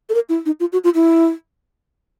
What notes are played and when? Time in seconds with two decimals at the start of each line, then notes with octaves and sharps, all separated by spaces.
0.09 A4
0.15 A#4
0.29 E4
0.46 D#4
0.60 F4
0.73 F#4
0.84 F4
0.95 E4